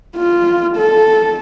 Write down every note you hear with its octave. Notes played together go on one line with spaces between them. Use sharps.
F4
A4